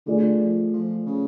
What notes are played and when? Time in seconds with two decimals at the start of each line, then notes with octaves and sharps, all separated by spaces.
0.06 D3 A3 F4 G#4 D5
0.39 F3
0.73 F3
1.06 C#3